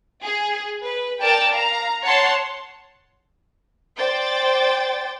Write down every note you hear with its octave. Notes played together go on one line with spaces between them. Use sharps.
G#4
B4
A#4 D5 G5 A5
F5 A#5
C#5 F#5 A5 C6
C5 D5 G5 A6